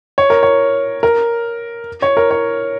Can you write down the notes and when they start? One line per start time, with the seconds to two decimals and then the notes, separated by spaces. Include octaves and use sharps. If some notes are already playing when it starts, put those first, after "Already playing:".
0.18 C#5
0.30 A#4
0.43 C#5
1.03 A#4
2.02 C#5
2.17 A#4
2.31 C#5